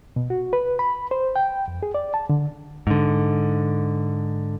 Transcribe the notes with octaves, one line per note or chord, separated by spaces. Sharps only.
B2
F#4
B4
B5
C5
G5
F2
G#4
D5
A5
D3
G#2 D3